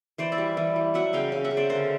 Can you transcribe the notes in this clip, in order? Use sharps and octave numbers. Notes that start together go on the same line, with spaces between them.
E3 C5 D5
D5 E5
G3
E3
G3
F#3 E5 F#5
C#3 F5 G5
C#3
E5 F#5
C#3
C5 D5
D3 A#4 C5